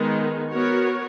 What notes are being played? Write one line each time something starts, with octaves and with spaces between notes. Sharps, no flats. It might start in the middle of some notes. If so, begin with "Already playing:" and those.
Already playing: D#3 G#3 B3 D#4
B3 F#4 A#4 C#5